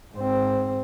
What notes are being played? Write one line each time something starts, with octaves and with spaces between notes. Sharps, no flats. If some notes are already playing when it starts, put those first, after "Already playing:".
G#2 C4